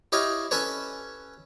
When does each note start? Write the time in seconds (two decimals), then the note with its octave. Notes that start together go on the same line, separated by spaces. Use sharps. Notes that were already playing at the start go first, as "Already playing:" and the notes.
0.12 E4 G4 C#5 D#5 F5
0.51 C#4 A4 B4 C#5